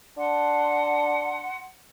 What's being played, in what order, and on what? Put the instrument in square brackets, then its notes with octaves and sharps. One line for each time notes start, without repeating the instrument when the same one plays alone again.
[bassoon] D4 [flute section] F#5 C6 [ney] A5